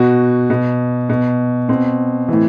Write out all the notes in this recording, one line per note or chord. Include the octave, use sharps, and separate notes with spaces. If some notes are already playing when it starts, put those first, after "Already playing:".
Already playing: B2 F#4
B2
B2
B2 C4
A2 E3